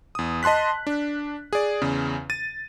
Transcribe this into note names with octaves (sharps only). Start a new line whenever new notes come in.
E2 D#6
D#5 A5 C6 F#6 B6
D4
G#4 D5
E2 C#3
A6 D#7